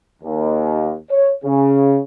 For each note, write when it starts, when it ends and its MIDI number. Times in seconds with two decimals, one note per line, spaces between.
0.23 0.95 39
1.10 1.31 73
1.45 1.99 49